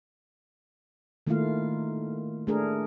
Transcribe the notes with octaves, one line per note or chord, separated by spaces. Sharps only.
D#3 A3 A#3 E4 F4 F5
A3 D4 G#4 A#4